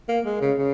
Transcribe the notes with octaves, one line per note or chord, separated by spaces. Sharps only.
A#3
G#3
C#3
C#3